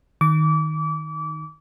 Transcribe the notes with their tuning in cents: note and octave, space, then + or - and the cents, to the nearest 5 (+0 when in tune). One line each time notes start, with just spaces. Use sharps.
D#3 +0 D6 -30